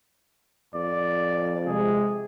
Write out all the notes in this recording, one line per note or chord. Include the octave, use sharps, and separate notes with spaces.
F2 D5
C3 G#3 G#4